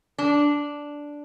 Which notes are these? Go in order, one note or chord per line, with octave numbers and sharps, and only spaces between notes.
D4